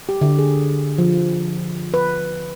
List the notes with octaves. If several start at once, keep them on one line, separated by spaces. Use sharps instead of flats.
G4
D3
G#4
F3
B4